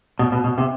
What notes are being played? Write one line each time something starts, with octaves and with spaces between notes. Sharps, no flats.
B2
B2
B2
C3